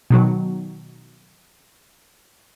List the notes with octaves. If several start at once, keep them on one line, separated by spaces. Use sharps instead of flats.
B2 D#3 F#3